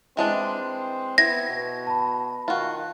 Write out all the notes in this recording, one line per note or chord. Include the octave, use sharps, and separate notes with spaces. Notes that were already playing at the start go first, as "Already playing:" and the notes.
E3 G#3 C4 D4
B3 E4 G#6 A#6
B2
A5 B5
D#3 F4 F#4